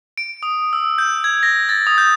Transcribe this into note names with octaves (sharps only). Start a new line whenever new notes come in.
D7
D#6
E6
G6
G#6
A#6
A6
D#6
G6